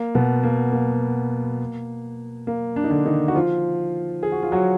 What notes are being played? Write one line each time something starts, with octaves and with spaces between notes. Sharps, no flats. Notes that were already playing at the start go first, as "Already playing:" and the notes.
Already playing: A#3
B2 B3
A#3
A#3
A#3
D4
D#4
D3 D4
D#3 D#4
F#4
F3 F4
G#4
F#4
F4
F#3 F#4